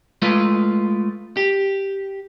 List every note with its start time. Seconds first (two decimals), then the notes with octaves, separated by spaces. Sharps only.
0.22 G#3 A3 F4 B4
1.37 G4